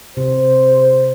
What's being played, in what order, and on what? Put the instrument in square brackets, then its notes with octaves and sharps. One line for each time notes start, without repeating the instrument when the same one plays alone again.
[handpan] C3 [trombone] C5